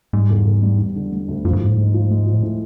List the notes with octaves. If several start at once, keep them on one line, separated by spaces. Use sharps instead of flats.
G#2 G3
E1
E1
G3
G3
D3
G3
D2
F#2 F3
G2
G#2 F3
A2
G#2 G#3
F3
G#3
F3
A2
A2